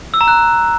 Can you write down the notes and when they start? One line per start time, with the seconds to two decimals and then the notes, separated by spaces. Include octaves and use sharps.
0.14 E6
0.21 A#5
0.28 F#6